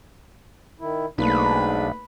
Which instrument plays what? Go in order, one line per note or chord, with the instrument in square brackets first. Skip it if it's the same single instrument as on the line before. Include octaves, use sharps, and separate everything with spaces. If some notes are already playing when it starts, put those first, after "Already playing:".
[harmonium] D#3 E4
[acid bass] B1 [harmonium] G#2 D4 [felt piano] A3 A#3 D#4 [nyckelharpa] B4 B5